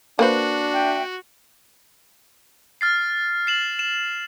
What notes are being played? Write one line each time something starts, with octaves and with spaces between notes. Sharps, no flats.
A#3 D4 F#4 B4 C5
E5 G5
F6 A6 C7
C7 E7 F#7
E7